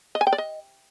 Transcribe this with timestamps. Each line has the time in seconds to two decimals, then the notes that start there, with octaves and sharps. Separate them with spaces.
0.15 D#5
0.21 G#5
0.27 G5
0.33 D5
0.38 D#5